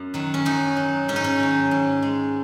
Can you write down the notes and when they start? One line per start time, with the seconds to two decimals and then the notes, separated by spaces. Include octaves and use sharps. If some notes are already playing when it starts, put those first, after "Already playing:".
Already playing: F#2
0.14 D#3 F#3
0.34 C#4
0.45 F#2 D#4
0.77 F#3
1.08 G#2 C#4
1.16 D#4
1.24 C#4
1.40 D#3 F#3
1.71 G#2
2.02 G#3